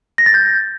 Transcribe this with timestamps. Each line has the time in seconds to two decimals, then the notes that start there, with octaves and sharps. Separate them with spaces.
0.18 A#6
0.26 A6
0.34 G6